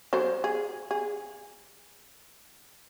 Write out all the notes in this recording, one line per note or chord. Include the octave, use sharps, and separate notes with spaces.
F#3 A4 C5
G#4
G#4